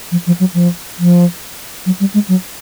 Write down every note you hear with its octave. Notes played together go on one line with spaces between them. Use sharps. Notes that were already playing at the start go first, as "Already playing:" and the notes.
F3
F3
F#3
F3
F3
F#3
G3
G#3
F#3